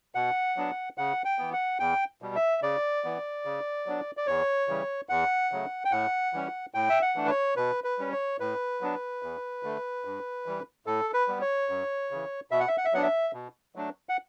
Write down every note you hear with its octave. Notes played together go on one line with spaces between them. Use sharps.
B2 F#5
F#3 B3 D4
C#3 F#5
G5
E3 B3
F#5
E2 G5
B2 G3
E5
C#3 D5
E3 B3
C#3
F#3 B3 D4
D5
E2 C#5
C#3 E3 G3
E2 F#5
C#3 F#3 A3
G5
A2 F#5
E3 G3 C#4
A2 G5
E5
F#5
E3 A3 D4
B4
C#5
B2 B4
B4
G3 C#4
C#5
A2 B4
F#3 B3 D4
E2
D3 A3
G2
E3 G3
A2 A4
B4
G3 B3
C#5
F#2
C#3 E3
B2 E5
F#5
E5
F#5
E5
F#3 B3 D4 F#5
E5
B2
F#3 A3 D4
F#5